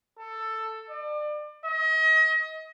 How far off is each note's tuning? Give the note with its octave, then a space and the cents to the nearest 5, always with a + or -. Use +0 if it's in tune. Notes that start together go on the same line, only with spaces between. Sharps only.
A4 +10
D5 +35
D#5 +35